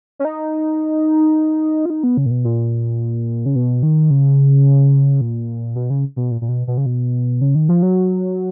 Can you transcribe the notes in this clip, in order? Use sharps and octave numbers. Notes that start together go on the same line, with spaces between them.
C#4
D#4
F4
D#4
B3
C#3
A#2
B2
A#2
C#3
B2
D#3
C#3
A#2
B2
C#3
B2
A#2
A#2
B2
B2
C#3
B2
C#3
D#3
F3
F#3